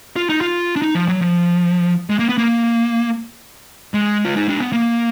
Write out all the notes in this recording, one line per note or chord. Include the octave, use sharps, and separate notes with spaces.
F4
D#4
F4
D4
D#4
F3
F#3
F3
G#3
A#3
B3
A#3
G#3
F4
D#4
D4
B3
A#3